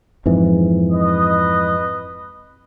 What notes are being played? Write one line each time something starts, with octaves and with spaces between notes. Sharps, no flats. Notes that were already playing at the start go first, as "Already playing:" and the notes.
F2 G#2 E3
B4 D#5